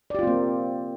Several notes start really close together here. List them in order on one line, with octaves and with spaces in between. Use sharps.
D5 G4 F4 C4 A#3